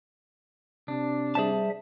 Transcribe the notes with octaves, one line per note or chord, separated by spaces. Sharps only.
C3 D4
G3 G#4 C5 E5 A5